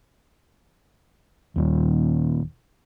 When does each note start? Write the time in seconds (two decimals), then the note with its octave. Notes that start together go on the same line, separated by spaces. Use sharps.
1.56 D#1 D#2